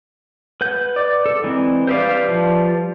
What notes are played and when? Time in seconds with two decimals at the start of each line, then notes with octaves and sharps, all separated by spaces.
0.61 B4 F#5 G6
0.96 D5
1.26 A4
1.44 G#2 E3 C4
1.87 G3 B4 C5 D5 E5 F5
2.29 F3